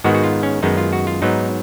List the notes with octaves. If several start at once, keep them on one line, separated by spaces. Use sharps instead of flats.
G#2 D#3 G#3 B3 F#4
F#4
F4
C#4
F#2 D#3 G#3 B3 D#4
F4
F#4
F4
G#2 F#3 B3 D#4